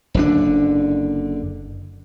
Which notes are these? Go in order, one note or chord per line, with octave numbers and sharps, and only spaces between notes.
F#1 D3 D4